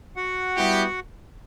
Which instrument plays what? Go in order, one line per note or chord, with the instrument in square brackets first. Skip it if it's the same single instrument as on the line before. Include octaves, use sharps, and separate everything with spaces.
[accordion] F#4 F#5
[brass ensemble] G3 B3 E4 G4